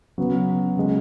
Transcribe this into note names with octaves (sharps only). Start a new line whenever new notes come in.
C#3 F#3 B3
C#3 G#3